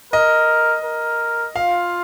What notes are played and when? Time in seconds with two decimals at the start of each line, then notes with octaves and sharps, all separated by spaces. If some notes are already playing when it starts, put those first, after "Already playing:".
0.13 A#4 D#5
0.84 A#4
1.56 F4 F5